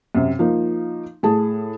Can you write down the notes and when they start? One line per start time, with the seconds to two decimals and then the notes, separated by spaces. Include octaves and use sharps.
0.15 F#2 C3
0.39 F3 A#3 D#4
1.23 A2 G#4 A5